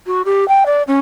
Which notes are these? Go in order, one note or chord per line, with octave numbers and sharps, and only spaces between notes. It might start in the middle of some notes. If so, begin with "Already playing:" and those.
F#4
G4
G5
D5
C#4